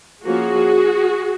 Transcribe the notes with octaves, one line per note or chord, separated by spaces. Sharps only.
F3 A#3 C#4 F#4 G#4